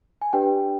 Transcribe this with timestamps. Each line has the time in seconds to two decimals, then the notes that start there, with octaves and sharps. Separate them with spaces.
0.22 G#5
0.33 D4 G4 B4 D5 G5